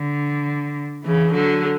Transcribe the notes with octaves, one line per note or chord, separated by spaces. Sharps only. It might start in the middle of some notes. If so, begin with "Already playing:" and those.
Already playing: D3
C#3 E3
D3 F#3